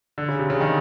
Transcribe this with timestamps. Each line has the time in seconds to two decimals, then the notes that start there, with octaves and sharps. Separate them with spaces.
0.18 D3
0.28 C#3
0.39 C3
0.50 C#3
0.60 D#3